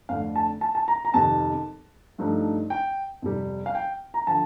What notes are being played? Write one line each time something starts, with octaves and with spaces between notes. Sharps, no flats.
F2 D3 A3 D4 F5
A5
A5
A5
A#5
A#5
F2 C3 D#3 A5
G2 F3 A3 D#4
G5
F2 C3 G3
F5
G5
A#5
D3 F3 A5